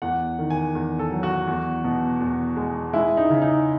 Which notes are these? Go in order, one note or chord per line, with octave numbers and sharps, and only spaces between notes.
E2 F#5
D#3
G#5
E2
A4
F#3
F#4
E2
B2
E2
G#3
G#3 E4
D#4
C#3
D#4